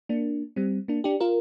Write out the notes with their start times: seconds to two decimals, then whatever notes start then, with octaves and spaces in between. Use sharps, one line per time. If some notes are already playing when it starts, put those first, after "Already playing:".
0.09 A#3 D4
0.56 G3 C4
0.88 A#3 D4
1.04 D4 G4
1.20 F4 A#4